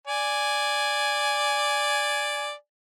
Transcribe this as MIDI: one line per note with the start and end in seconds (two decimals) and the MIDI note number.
0.07 2.53 74
0.07 2.53 80